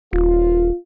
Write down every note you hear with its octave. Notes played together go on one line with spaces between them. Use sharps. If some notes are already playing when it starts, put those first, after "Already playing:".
D#1 F4